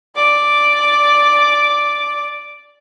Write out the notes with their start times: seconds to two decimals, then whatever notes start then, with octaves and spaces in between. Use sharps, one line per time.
0.15 D5 D6